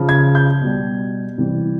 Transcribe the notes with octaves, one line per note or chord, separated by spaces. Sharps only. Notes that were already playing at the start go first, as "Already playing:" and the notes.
Already playing: C#3 F3
G#6
G6
B2 G3
C3 E3 G3